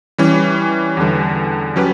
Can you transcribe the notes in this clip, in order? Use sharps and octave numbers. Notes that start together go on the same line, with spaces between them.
E3 G3 C#4
E2 D3 G3
F#3 C#4 G4 B4